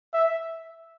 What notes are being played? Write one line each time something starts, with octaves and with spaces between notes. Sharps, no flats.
E5